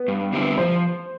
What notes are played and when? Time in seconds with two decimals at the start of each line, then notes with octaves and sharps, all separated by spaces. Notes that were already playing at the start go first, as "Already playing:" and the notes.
Already playing: B3
0.08 G2
0.33 D3 G3 C4 E4
0.58 F3 C5